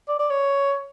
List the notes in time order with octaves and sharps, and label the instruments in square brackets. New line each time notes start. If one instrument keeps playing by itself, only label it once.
[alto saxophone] D5
D5
C#5